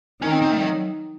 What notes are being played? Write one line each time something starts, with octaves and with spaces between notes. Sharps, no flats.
D#3 C#4
C4
C4
A3
G3
F#3